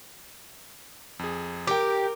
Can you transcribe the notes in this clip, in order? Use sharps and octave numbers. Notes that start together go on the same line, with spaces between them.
F2 G#4
G4 A#4 G5 D6